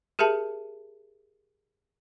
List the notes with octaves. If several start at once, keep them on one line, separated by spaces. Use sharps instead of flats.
G4 G#4 A#4 E5 A5